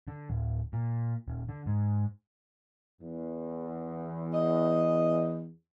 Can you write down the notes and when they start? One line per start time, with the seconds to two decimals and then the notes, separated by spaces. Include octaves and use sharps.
0.08 D3
0.30 D1
0.73 A#2
1.28 D#1
1.49 D3
1.66 G#2
3.01 E2
4.33 D#5